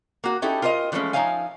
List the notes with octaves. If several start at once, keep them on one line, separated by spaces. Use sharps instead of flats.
A#3 F#4
C#4 D#4 E4 G4 A4
F4 A#4 C5 D5 D#5
D3 E3 F3 G#3 A3 C#4
F3 D#4 C#5 E5 F5 G#5